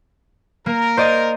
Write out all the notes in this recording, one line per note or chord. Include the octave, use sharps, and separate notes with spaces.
A#3 A#4
C5 D5 D#5